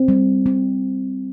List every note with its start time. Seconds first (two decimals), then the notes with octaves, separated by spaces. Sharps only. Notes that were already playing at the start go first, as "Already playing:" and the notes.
Already playing: C4
0.08 G3
0.46 C4